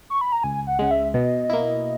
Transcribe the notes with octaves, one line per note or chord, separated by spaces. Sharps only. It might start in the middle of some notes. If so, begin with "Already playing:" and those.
C#6
B5
A#5
C#2 G#5
F#5
C#3 G#3 F#5
E5
B2 D#5
A#3 E4